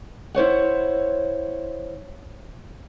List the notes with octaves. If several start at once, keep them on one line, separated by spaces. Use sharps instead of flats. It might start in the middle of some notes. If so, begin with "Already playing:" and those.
E4 C5 C#5 F#5